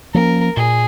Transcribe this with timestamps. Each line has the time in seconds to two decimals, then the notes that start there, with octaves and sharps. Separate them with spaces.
0.14 F3 A#3 C#4 A#4
0.56 A#2 G#4